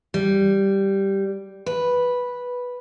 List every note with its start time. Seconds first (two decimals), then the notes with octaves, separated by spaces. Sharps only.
0.14 G3
1.66 B4